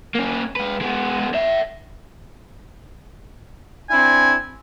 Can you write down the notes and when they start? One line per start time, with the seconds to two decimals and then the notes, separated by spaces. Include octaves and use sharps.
0.15 A#3 C#4
0.56 G#3 B4
0.81 G#3 B3
1.34 C#5 E5
3.90 C4 D4 E4 G#5